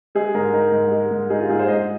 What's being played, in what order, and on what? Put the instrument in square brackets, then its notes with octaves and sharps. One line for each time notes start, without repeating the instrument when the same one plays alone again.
[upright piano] G#3 G#4
G#2 A#4
D#4 A#4
G#2
G#3
G#2
D#4 G#4
F4
G#2 G#4
C5
G#2 D#5